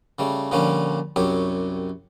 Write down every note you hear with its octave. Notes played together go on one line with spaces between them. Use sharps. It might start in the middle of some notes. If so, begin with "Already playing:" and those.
C#3 G3 A3
A#2 D3 F3 G3 C#4 D4
C2 F#2 F#3 G4